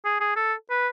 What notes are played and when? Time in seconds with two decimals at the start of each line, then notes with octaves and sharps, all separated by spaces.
0.05 G#4
0.20 G#4
0.36 A4
0.70 B4